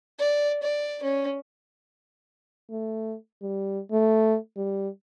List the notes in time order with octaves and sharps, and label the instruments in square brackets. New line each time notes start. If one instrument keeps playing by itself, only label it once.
[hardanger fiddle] D5
D5
C#4
[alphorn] A3
G3
A3
G3